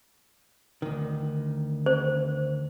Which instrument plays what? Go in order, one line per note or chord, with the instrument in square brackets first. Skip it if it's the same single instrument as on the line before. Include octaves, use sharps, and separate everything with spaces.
[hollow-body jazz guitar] D2 D#3
[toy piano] C5